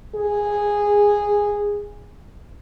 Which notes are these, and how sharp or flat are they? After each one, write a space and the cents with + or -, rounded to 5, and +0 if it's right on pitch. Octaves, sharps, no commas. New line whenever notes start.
G#4 -10